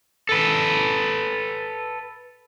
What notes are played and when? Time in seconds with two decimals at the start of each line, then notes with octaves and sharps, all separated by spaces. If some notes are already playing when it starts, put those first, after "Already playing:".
0.29 A4 B4